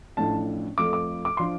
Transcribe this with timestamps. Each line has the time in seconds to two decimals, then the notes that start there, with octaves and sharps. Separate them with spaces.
0.17 A1 A2 F3 D4 A5
0.78 F2 F3 A3 D6
0.93 D6
1.25 D6
1.37 F3 D4 C6